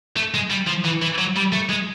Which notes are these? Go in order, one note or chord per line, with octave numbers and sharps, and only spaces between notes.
A3
G#3
G3
F3
E3
E3
F#3
G3
A3
G#3